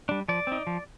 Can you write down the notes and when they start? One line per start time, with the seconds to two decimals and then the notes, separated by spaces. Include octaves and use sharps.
0.09 G3 D4
0.29 F3 D5
0.47 C4 D#4
0.67 F3